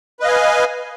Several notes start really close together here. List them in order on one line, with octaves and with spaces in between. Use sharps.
B4 D#5 F5 G#5